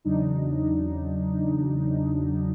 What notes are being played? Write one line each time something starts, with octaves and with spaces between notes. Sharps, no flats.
E2 C#3 F#3 D4 D#4